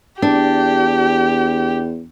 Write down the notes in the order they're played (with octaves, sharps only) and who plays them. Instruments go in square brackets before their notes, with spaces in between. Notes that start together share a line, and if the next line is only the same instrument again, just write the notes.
[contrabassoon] E2 [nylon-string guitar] D4 [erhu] G4